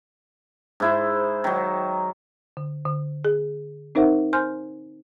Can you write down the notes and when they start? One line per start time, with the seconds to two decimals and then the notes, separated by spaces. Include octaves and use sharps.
0.80 G#2 E4 C5
1.44 D#3 F#3
2.57 D3
2.86 D3
3.25 G#4
3.95 C4 D#4 A#4 C5 E5 F#5
4.33 C5 G#5 C6 F6 G6